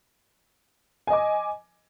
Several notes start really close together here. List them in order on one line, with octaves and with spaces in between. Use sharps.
G#5 D#5 D6